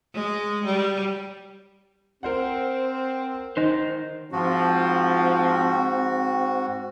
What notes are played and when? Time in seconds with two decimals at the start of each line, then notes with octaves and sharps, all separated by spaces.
0.14 G#3
0.65 G3
2.23 C4 A#4 C5 F#5
3.57 D#3 D#4 C5
4.32 G#2 F3 C4 F#4